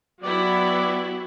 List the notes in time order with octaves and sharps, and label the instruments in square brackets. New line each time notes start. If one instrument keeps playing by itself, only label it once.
[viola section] F#3 B3 E4 [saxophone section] G4 D5